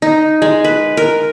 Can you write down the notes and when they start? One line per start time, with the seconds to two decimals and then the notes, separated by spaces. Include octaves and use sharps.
0.02 D#4
0.42 G#3
0.64 B4
0.97 A#4